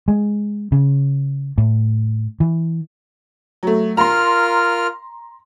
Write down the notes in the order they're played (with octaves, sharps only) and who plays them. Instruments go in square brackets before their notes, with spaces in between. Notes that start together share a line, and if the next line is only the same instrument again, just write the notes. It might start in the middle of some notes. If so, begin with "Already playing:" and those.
[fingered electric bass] G#3
C#3
A2
E3
[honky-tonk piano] F#3 A3
[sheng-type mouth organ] F4 A#4 F6 [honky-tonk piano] A#5 C6